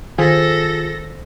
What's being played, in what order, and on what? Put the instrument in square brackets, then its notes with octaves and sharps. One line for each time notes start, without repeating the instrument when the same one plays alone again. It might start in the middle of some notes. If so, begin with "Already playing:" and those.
[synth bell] D#3 C5 B6 [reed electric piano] F4 G#4 G#5 [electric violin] A4 A#6